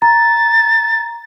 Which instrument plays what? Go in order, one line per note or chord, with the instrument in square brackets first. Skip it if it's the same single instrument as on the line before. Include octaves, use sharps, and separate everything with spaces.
[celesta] A#5 [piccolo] A6